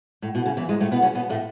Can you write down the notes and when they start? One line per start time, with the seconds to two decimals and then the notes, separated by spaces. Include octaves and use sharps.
0.22 A2
0.35 B2
0.46 C#3
0.57 E2 E3
0.69 G#2 G#3
0.80 A2 A3
0.91 B2 B3
1.02 C#3 C#4
1.15 B2 B3
1.30 A2 A3